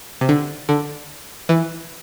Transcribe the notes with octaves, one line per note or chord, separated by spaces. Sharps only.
C3
D3
D3
E3